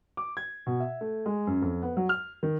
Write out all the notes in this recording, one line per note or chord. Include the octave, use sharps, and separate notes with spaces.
D6
G#6
B2
E5
A3
G#3
F#2
F2
B3
F#3
F6
D#3